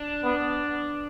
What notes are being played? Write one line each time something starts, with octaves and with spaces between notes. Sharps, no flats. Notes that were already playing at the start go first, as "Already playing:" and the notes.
Already playing: D4
B3